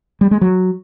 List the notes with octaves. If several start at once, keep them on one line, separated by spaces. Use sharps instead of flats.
G3
G#3
F#3